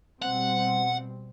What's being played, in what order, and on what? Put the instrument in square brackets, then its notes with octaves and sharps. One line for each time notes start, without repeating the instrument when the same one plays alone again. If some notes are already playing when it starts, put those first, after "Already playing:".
[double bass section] B2 G3 C4 [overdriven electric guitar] F#5